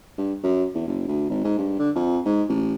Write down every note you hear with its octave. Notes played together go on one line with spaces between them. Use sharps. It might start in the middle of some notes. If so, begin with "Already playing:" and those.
G2
F#2
E2
F#1
D2
G#1
G#2
G2
D3
F2
G#2
A1